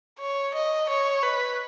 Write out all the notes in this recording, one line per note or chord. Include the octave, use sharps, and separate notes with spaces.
C#5
D#5
C#5
B4